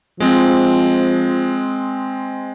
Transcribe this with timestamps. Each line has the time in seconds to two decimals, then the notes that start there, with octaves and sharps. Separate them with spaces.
0.20 F3 G#3 C4